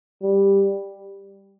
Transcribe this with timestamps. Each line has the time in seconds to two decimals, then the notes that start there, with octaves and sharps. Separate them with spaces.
0.23 G3